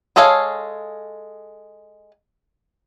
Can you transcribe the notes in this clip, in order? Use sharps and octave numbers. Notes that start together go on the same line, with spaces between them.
G#3 G#4 A4 C#5 F5